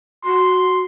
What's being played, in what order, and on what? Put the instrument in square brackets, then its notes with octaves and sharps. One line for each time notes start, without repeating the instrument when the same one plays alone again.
[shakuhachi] F#4 [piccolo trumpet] C6